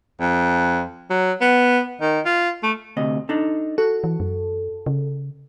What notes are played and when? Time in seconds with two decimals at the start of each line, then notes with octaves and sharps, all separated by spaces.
0.20 F2
1.10 F#3
1.41 B3
2.01 D#3
2.25 F4
2.63 A3
2.97 D2 C3 D#5
3.29 D4 D#4 A4
3.78 F#4 A4
4.04 E3
4.20 F#2
4.86 C#3